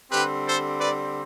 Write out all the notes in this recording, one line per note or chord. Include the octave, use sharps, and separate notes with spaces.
D3 G3 C4 G4 B4
A4 C5
B4 D5